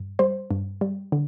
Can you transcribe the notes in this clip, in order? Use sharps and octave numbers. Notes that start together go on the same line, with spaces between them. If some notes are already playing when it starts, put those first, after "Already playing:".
Already playing: G2
G3 C5
G2
G3
D3